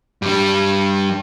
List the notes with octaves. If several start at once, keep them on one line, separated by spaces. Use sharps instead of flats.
G2 G3